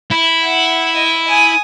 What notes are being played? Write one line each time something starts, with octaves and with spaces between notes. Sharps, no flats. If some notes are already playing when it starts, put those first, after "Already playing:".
E4
F#5
D#5
G#5 D#6